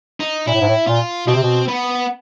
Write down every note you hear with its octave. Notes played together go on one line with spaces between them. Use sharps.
D#4
A#2 E4
A2
G#2
A2
A#2 F4
B2 C4
C3
B2
B3